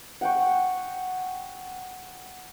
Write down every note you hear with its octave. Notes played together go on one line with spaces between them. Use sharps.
F#5 G5 C#6